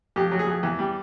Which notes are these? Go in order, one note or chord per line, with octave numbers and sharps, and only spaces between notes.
F2 G4
F#3
G#4
F2
E2
G3